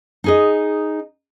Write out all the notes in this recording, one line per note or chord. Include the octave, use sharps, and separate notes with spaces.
D#4 G#4 D#5